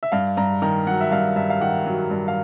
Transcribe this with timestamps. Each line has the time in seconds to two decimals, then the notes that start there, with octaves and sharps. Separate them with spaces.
0.03 E5
0.12 G2 F5
0.37 G2 A#5
0.62 D#3 A#5
0.87 F#3 F#5
1.01 E5
1.11 G2 F5
1.36 G2 E5
1.50 F5
1.61 D#3 F#5
1.86 F#3
2.11 G2
2.28 F5